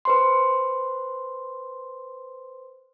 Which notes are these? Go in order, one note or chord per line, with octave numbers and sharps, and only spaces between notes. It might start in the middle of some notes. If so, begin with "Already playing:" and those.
B4 C5 C6